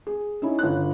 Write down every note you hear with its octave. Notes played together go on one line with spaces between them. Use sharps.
G#4
C#4 D#4 E4
G1 C#5 F#6